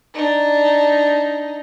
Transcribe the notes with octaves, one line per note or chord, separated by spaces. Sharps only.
D4 D#4